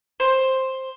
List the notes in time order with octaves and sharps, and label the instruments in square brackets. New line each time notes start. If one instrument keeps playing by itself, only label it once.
[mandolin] C5